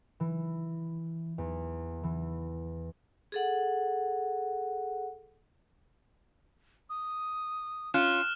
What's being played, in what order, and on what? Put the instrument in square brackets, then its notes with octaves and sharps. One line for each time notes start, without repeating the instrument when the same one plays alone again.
[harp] E3
E2
E3
[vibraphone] G#4 A4 F#5
[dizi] D#6
[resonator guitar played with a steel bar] C#4 F4 [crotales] F6 F#6 E7